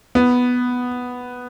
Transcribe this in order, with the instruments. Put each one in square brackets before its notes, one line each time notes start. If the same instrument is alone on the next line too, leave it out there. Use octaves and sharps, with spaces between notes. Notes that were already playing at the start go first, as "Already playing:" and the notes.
[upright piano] B3